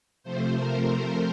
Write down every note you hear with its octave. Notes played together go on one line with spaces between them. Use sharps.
C3 F3 A3 C5
A#4
A#4